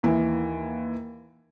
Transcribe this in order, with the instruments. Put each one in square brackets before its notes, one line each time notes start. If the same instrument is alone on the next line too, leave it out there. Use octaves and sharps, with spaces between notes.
[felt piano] D#2 E3